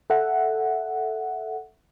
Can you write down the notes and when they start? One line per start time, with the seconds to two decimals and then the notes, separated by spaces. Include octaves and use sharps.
0.10 A4 E5 F#5